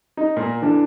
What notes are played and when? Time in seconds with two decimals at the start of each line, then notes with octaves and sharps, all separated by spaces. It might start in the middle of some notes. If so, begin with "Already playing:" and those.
0.17 D#4
0.37 A#2 A#3
0.62 D3 E3 D4